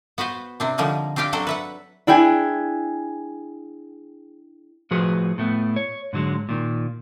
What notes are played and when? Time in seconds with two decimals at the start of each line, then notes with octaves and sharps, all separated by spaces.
0.18 B3 F#4 B4 C5
0.60 C3 C4 D4
0.78 D3 F3 G3 A#3 D#4
1.16 C4 D4 G4 F5 G5
1.33 F#3 C4 D4 A4 C5
1.47 B4 E5 F#5
2.07 D4 E4 G#4 G5 G#5
4.91 A2 F3 F#4 G#4 B4
5.38 A2 A3 B3
5.76 C#5
6.13 G#2 D3 F#3 G#3
6.49 A#2 D#3